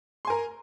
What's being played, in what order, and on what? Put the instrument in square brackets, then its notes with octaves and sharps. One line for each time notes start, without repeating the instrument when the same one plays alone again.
[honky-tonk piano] C6
G#5
A#4